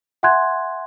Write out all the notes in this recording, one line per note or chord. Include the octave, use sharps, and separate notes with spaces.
E5 F#5 G#5 C6 F#6 G#6